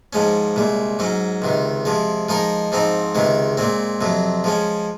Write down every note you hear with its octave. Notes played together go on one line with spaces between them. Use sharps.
G#2 F3 G#3 C#4
C2 A#2 G#3
G#2 F#3 C#4
C#2 C3 D#3
C3 F3 G#3
F3 G#3 D#4 A#4
G#2 F3 C4 D#4
C#2 C3 D#3 G#3
A#2 G#3 C4
F2 C3 F#3
F3 G#3 C#4